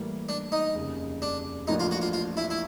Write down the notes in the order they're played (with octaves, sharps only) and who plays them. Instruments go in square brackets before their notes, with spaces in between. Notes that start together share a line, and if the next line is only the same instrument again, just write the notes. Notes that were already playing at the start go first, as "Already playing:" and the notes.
Already playing: [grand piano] A2 E3 G3 A#3
[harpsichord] D4
D#4
[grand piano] F1 D#2 C#3
[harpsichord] D4
[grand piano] A1 A2 F3 A#3 D4 [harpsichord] D#4
[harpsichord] F4
F#4
F4
F4
E4
E4